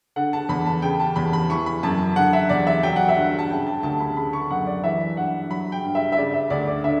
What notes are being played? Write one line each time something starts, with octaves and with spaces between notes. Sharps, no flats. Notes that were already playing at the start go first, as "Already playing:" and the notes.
D3 F#5
A5
E2 B5
A5
C#3 G5
A5
E2 B5
B5
E3 C#6
B5
F#2 A5
D3 F#5
E5
E2 D5
E5
F#3 G5
F#5
E5
G2 F#5
A5
C#3 G5
A5
D2 A5
B5
C#3 B5
C#6
F#2 F#5
D5
E3 E5
G2 F#5
F#3 B5
G5
G2
E5
E5
C#3 D5
E5
D2 D5
D5
D3 E5